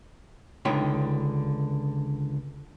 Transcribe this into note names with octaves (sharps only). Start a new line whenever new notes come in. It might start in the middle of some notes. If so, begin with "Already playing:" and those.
C#2 D3 D#4 C#5 G5 B5